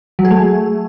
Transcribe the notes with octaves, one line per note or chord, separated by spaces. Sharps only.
F#3
G#4
A3